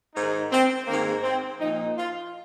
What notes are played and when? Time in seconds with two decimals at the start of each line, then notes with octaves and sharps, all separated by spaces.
0.15 G#2 D#3 D#4
0.51 C4
0.87 G#2 D#3 A#3
1.23 C4
1.60 A#2 F3 D#4
1.97 F4